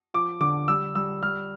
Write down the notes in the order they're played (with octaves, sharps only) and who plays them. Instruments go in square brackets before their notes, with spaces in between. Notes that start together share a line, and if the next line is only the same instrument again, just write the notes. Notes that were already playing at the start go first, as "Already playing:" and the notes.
[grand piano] F3 D6
D3 D6
G3 E6
G3 E6
G3 F6